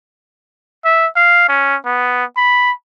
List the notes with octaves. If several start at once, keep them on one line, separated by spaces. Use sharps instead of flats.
E5
F5
C#4
B3
B5